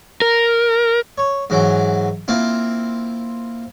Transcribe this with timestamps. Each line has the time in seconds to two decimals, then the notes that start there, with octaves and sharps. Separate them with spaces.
0.22 A#4
1.18 C#5
1.50 G#2 E3 F#3
2.28 A#3 C4 E4 F4